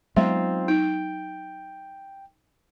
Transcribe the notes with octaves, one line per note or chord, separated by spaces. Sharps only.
F#3 G#3 B3 C4 D#4 F4 E5
D#4 G5